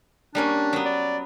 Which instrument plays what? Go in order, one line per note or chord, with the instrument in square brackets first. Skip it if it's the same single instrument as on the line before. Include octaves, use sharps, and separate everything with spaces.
[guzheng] G3 A#3 C#4 [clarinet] D4
[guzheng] F#3 B3
[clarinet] D5